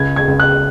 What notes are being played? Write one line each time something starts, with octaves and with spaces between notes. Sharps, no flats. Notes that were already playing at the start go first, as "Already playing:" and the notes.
Already playing: C#2 G#6
G#6
C#2
F#6